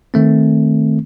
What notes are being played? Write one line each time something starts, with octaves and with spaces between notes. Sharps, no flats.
D#3 A3 C4